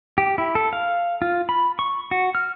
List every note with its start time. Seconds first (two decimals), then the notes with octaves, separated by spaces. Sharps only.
0.18 G4
0.38 E4
0.55 A4
0.73 F5
1.22 F4
1.49 B5
1.79 C#6
2.11 F#4
2.35 F6